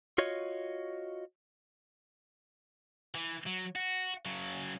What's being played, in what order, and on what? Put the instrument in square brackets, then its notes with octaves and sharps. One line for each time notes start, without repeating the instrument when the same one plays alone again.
[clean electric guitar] F4 F#4 C#5 D#5
[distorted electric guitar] E3
F#3
F#4
C#3 F#3